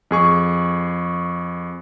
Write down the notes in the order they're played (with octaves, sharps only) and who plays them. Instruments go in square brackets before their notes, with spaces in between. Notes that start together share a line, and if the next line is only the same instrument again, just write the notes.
[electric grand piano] F2 G#4 C#6